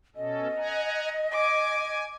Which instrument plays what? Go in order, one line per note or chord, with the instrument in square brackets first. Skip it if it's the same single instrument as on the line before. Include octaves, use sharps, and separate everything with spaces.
[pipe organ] B2 C#4 A4 [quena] D#5
[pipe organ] F#5 G#5 A#5
[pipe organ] G#5 [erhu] D6